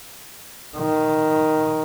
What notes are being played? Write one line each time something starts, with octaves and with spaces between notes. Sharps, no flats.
D#3